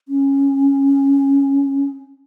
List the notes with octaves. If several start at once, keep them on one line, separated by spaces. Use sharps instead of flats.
C#4